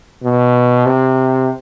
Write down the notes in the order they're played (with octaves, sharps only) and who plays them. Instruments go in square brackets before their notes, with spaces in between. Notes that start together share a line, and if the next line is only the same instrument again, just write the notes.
[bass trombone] B2
C3